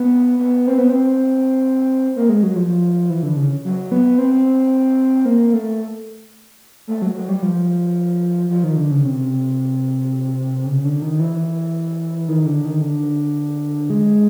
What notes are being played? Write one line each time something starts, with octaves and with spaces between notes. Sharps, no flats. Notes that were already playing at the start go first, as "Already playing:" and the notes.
Already playing: B3
B3
C4
B3
C4
A#3
G#3
F#3
F3
E3
D3
C#3
F#3
B3
C4
A#3
A3
A3
F#3
F#3
G3
F3
F3
D#3
D3
C#3
C3
C#3
D3
D#3
E3
D#3
D3
D#3
D3
G#3